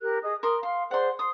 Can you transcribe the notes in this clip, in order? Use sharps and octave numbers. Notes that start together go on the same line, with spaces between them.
G4 A#4 F#6
G#4 D#5 D#6
A#4 C6 D#6
F5 C6
G#4 C5 D5 F#5 C6
C6 D#6